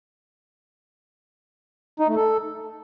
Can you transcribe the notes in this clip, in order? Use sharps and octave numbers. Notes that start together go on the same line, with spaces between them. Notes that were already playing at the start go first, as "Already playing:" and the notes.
D#4
A3
A4